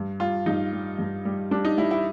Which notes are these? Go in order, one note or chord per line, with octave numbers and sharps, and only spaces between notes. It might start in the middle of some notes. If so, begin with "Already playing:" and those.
Already playing: G2
G3 F4
G2 D#4
G3
G2
G3
G3 D4
D#4
G3 E4
E4